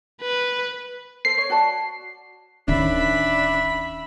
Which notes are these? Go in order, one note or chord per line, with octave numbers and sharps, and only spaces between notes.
B4
A4 C5 C7
C#5
F#4 D5 A5
D1 D#3 C#4 D4 E5 B5